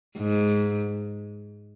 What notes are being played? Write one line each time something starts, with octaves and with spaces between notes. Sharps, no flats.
G#2